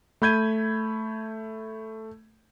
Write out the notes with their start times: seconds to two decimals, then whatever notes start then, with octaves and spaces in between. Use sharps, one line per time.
0.22 A3 B5 G6 G#6 D#7